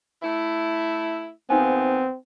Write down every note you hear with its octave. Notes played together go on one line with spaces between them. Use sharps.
A3 E4
D#2 F3 B3 C4 D#4 G#5